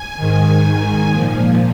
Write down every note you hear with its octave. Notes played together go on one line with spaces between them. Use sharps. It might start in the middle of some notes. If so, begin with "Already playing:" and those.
Already playing: G#5
G#2 D#3
A#2 F3